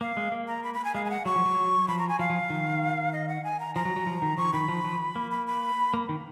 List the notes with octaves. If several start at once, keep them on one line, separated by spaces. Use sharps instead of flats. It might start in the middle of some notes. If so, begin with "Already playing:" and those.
A#3 F5
G#3
A#3
A#5
B5
B5
G#5
G#3 F5
G#5
F#5
F#3 C#6
F3
F#3
F3 B5
A#5
G#5
F3 F5
F3
D#3
D#5
F#5
G#5
A#5
F3 A#5
F#3
F#3
F3
D#3
F3 C#6
D#3 B5
F3
F3
A#3
B5
B5
A#3
D#3